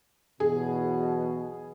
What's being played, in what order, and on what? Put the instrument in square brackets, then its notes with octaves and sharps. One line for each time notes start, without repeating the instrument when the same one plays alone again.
[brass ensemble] B1 E2 B2 [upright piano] G#4